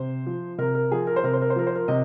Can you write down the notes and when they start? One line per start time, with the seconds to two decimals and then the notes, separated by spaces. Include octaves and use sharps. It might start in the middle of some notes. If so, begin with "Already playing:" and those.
Already playing: C3 C5
0.27 F3
0.58 C3 A#4
0.75 A#4
0.92 F3 G#4
1.07 A#4
1.16 C5
1.24 C3 A#4
1.33 C5
1.42 A#4
1.50 C5
1.56 F3 A#4
1.67 C5
1.75 A#4
1.88 C3 D#5